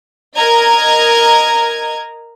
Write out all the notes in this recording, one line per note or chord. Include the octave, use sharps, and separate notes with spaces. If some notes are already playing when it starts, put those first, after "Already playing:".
A#4 D#5 A#5 G#6